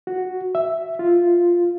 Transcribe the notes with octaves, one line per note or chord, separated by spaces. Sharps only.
F#4
E5
F4